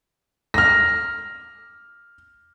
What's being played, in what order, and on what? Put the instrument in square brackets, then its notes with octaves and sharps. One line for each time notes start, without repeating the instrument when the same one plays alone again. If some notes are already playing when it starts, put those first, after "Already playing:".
[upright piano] F6 A#6